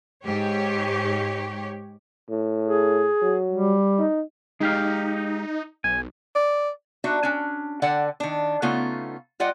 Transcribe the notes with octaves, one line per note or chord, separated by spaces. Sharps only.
G#2 G4 C#5
A2
G#4
F#3
G3
D#4
G#3 D#4 G4 F5
B1 G#5
D5
D4 D#4 F#4 E5
C#4 D4
D3 A4 D5 F#5 G5
D#3 D4
C#3 A3 B3 D#4 F4
G3 F4 D5 D#5 F#5 G5